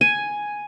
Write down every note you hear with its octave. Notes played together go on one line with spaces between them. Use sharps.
G#5